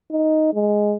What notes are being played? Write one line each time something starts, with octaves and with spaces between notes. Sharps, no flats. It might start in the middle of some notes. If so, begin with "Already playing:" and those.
D#4
G#3